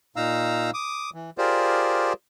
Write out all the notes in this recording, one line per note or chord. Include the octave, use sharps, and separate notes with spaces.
A#2 D#4 F5 A#5 E6
D6 D#6
E3
F4 G4 G#4 A#4 C5 D5